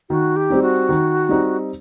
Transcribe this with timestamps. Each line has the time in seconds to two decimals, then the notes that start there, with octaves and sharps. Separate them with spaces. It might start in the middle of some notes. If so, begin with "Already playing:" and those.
0.10 D#3 F#4
0.36 G4
0.50 G3 C4 D#4
0.62 F#4
0.89 D#3
1.29 G3 C4 D#4